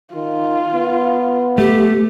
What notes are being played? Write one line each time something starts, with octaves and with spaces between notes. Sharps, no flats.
D#3 F4
B3
A3 G4